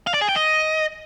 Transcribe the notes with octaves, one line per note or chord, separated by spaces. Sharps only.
F5
D5
G#4
G5
D#5